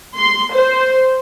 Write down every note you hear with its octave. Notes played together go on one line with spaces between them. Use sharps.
C6
C5